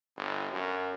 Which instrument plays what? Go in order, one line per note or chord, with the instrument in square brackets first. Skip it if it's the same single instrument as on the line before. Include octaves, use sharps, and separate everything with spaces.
[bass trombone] G1
F#2